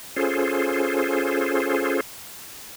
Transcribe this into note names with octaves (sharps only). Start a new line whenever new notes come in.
C#4 F4 G#4 A4 C5